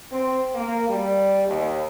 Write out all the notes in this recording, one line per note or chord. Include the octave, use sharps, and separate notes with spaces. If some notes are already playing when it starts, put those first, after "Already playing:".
C4
A#3
G3
D#2